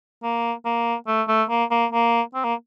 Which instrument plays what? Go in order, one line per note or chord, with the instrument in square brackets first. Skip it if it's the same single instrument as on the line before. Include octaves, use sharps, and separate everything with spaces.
[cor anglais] A#3
A#3
A3
A3
A#3
A#3
A#3
C4
A#3